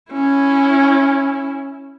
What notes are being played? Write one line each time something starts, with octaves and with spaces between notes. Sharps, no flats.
C#4 E4